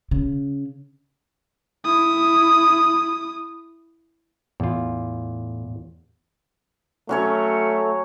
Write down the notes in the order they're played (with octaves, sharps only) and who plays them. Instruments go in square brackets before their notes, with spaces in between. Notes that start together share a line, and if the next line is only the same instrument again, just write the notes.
[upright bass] C#3
[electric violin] E4 D#6
[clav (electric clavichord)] E2 F4 [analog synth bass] A2
[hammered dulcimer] F#3 C#4 C#5 [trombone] A3